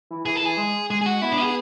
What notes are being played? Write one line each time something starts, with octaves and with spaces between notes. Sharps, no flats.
E3
E3 G#4
A4
E3 G#4
G#3
G#3 G#4
G#4
F#4
B3 E4
D4
G#4